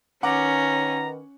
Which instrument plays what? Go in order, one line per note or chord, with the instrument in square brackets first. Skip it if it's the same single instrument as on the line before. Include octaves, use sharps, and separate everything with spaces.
[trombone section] D#3 B4 [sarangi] C#4 [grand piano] F#5 D6 [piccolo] A#5